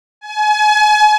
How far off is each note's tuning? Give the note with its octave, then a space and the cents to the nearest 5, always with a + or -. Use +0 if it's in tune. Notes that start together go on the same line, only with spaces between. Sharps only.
G#5 +35